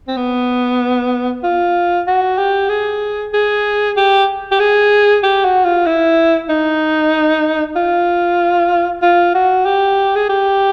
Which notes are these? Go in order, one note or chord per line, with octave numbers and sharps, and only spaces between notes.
C4
B3
F4
F#4
G4
G#4
G#4
G4
G4
G#4
G4
F#4
F4
E4
D#4
F4
F4
F#4
G4
G#4
G4